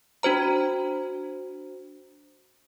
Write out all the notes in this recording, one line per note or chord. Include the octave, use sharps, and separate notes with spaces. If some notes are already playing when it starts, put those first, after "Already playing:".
D4 F#4 C5 A#5